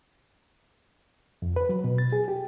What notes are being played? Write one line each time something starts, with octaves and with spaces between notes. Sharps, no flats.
F2
B4
F#3
B2
A6
G#4
G4